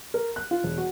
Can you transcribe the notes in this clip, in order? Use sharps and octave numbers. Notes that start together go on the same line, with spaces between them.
A#4
F#6
F4
E1
F#4